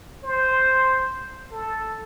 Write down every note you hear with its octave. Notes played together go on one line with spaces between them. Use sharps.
C5
A4